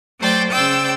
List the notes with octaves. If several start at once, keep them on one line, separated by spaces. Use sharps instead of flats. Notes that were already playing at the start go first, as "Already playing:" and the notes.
F#3 A3 C5 D5 G5
C#3 C5 D5 G5 E6